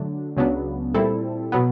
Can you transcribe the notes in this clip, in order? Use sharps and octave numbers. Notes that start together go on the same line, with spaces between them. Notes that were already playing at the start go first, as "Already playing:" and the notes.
Already playing: D3 F#3 A3 D4
C#2 C#3 F#3 B3 D4
A#2 G3 C4 E4 A4
B2 F#3 B3